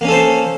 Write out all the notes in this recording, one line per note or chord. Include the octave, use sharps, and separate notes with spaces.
A#3 C#4 A4 C5